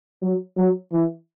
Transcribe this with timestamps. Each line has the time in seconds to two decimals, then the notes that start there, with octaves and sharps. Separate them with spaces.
0.22 F#3
0.57 F#3
0.93 E3